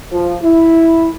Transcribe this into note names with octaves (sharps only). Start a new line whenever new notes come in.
F3
E4